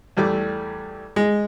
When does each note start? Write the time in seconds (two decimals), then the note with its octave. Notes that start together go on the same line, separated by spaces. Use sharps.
0.17 E2 G3 A3 D6
1.16 G#3